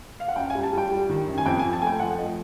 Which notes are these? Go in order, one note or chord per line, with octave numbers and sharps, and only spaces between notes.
F5
F#5
F#2 G5
G#5
G3
A5
G3 G5
G3
D#3
F#2
G#5
F2 G5
G#5
F2
A5
A3 G#5
G5
F3 F#5
A3 D#5